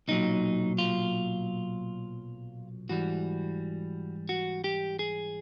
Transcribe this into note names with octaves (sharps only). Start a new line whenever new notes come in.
B1 A#2 F#3 D#4
F4
G#2 E3 G3 F#4
F#4
G4
G#4